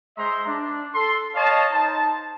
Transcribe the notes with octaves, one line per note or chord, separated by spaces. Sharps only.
G#3 C5 E5 A#5 C6
D4
A4 C6
C#5 D#5 F5 A5
D#4 C5 A5